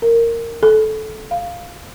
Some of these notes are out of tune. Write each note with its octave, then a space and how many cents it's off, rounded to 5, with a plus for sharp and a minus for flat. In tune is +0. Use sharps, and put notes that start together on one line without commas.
A#4 -15
A4 -20
F5 +0